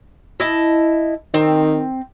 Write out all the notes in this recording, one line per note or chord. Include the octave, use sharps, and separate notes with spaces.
E4 D#5 A5
D#3 C4